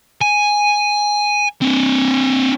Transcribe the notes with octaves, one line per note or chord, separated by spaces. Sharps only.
G#5
C4 D4